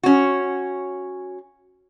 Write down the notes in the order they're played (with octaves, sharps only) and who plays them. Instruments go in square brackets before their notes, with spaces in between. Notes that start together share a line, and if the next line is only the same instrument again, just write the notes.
[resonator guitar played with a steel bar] C#4 F#4